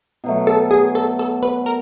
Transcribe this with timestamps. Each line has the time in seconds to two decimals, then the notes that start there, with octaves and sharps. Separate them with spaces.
0.24 B2 F#3 A3
0.47 A4
0.71 G#4
0.95 A4
1.19 A4
1.43 B4
1.66 A#4